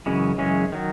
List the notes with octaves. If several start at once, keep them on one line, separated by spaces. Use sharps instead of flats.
F#2 C#3 E3 G#3 C#4
F#2 C#3 E3 G#3 C#4
D#3 F#3